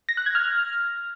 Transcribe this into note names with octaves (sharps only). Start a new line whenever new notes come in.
A#6
F#6
G#6
F6